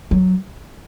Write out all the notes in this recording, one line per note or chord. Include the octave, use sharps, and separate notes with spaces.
F#3